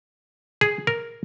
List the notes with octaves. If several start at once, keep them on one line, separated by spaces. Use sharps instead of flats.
G#4
A#4